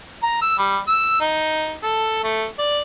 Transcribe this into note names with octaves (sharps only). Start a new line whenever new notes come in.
A#5
E6
G3
E6
D#4
A4
A3
D5